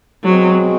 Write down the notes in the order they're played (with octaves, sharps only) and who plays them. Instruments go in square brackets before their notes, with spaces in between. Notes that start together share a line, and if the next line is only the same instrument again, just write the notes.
[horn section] B2 G#3 C4 [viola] F#3